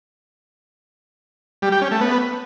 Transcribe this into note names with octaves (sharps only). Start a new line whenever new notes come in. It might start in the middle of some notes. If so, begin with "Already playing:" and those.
G3
G4
C#4
A3
B3